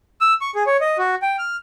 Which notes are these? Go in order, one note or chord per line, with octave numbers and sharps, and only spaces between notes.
E6
C#6
G#4
C#5
D#5
F#4
G5
F6